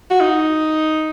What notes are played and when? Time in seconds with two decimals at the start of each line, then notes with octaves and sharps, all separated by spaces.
0.10 F#4
0.21 D#4